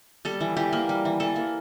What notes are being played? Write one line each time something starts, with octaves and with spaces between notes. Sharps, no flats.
G3 A4
E3
E3 G4
A#3
G3
E3
E3 A4
A#3